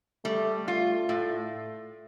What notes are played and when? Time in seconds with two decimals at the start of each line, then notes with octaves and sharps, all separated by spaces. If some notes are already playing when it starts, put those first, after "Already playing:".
0.25 G3 A3
0.67 A3 F4
1.09 A2 A3